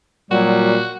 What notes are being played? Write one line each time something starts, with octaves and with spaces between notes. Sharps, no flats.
A#2 F#3 G3 F#4